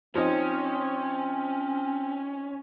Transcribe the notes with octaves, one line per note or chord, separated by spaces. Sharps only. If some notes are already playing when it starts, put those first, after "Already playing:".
F3 C4 C#4 D#4 D#5